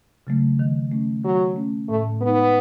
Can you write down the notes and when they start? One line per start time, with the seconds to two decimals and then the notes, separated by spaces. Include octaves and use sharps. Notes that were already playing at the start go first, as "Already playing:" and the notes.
0.27 C#3 F#3 A3
0.59 D#3
0.91 A3 C#4
1.24 D#3 F#3
1.56 A3 C#4
1.89 A2 A3
2.21 G#3 B3 D#4